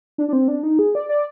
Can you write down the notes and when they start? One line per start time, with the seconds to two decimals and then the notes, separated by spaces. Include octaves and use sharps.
0.18 D4
0.28 D4
0.33 C4
0.48 D4
0.63 D#4
0.79 G#4
0.95 D5
1.09 D5